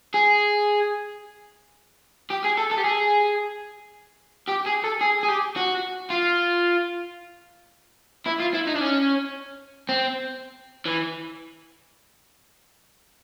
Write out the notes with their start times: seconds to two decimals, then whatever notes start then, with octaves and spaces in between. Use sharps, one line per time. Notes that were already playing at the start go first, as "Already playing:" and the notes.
0.14 G#4
2.31 G4
2.45 G#4
2.58 A4
2.71 A4
2.78 G4
2.84 G#4
4.48 G4
4.66 G#4
4.84 A4
5.01 G#4
5.23 G#4
5.29 G4
5.56 F#4
6.10 F4
8.27 E4
8.40 F4
8.54 E4
8.67 D#4
8.76 D4
8.81 C#4
9.89 C4
10.86 E3